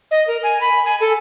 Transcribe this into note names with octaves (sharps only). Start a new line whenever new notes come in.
D#5
A#4
G#5
B5
G#5
A4